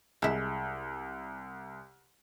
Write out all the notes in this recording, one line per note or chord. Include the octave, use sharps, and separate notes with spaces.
C2 G#3 E4